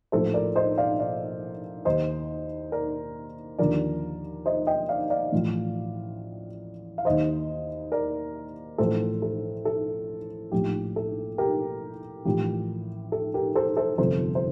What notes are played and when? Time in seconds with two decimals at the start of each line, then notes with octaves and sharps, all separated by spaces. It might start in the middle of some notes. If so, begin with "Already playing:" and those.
0.12 A#1 A2 F3 A4 C5
0.34 A#4 D5
0.55 C5 D#5
0.78 D5 F5
1.00 D5 F5
1.85 D#2 D#3 C5 D#5
2.72 A#4 D5
3.59 D#2 D3 F3 A#4 D5
4.46 C5 D#5
4.67 D#5 G5
4.89 D5 F5
5.10 D5 F5
5.32 A1 A2 F3
6.98 F5
7.05 D#2 D#3 C5 D#5
7.92 A#4 D5
8.78 A1 A2 F3 A4 C5
9.22 A4
9.65 A4
10.52 A#1 A2 F3 G4
10.96 A4
11.38 G4 A#4
12.25 A1 A2 F3 G4
13.12 A4
13.34 G4 A#4
13.55 A4 C5
13.77 A4 C5
13.98 G1 F2 C3 F3 A4 C5
14.35 C5